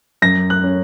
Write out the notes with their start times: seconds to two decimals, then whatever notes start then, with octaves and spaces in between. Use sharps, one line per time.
0.22 F#2 A#6
0.50 F#6
0.64 C#4